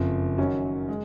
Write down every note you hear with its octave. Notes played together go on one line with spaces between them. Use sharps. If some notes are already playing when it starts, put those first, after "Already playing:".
Already playing: F#1 F2 F3
F#2 D#3 F#3 C#4
G#3